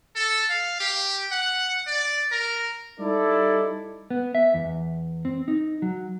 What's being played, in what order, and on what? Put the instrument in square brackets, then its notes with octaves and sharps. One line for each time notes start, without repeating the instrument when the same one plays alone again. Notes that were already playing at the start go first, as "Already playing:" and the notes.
[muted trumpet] A4
F5
G4
F#5
D5
A#4
[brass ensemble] G3 D#4 E4 A4 D5
[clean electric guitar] B3
E5
E2
C4
D#4
F#3